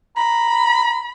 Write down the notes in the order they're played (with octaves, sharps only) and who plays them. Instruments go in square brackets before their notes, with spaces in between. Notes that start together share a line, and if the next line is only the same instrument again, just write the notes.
[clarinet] A#5 [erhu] B5